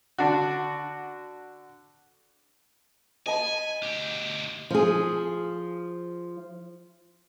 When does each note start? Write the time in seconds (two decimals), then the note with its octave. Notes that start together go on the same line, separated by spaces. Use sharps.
0.18 D3 D4 F#4
3.26 D#5 G#5 A5 B5
3.83 D2 G4
4.70 F3 G#4